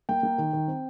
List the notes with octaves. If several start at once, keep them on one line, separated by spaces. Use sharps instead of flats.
A#3 G5
A#3
D#3
D#3
C4